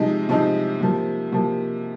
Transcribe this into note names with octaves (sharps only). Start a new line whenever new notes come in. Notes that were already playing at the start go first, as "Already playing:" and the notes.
Already playing: C3 F3 G#3 C4 D#4
C3 F3 G#3 C4 D#4
C3 F3 A#3
C3 F3 A#3